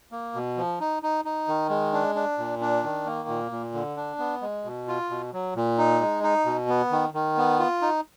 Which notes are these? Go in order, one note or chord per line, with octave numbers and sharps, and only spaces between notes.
A#3
B2
F3
D#4
D#4
D#4
D#3
G#3
D4
D4
A#2
D4
D#3
A#3
A#2
A#2
D3
D4
B3
G#3
B2
F4
B2
F#3
A#2
D#4
G#3
D#4
B2
B3
D#3
D#3
B3
F4
D#4